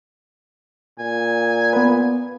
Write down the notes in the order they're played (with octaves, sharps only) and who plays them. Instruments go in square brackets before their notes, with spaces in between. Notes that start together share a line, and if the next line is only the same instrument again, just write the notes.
[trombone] A#2 [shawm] G#5
[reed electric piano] B3 B4